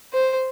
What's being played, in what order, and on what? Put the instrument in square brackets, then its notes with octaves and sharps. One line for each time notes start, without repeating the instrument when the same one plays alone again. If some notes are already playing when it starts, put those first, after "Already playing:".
[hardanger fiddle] C5